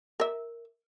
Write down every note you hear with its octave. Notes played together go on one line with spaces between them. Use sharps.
A#4 E5